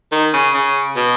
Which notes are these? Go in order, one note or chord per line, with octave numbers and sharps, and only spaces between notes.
D#3
C#3
C#3
B2